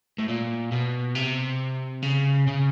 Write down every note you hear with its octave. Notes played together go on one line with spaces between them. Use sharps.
A2
A#2
B2
C3
C#3
C#3